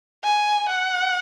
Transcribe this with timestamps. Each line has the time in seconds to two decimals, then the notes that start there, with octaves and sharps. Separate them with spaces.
0.24 G#5
0.68 F#5